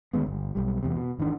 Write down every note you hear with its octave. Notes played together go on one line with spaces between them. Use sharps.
D2 D#3 G#3 B3
G1
B1 G3
E2 C3
B2
G#1 D#3 E3 D4